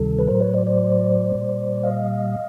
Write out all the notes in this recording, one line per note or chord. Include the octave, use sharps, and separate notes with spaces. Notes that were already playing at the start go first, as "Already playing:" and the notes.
Already playing: D2 C3 D#3 G3 A4
B4
A2 F#3 A#4 C5
B4 C#5
C5 D5
C5 D5
A#2 G3
D#5 F5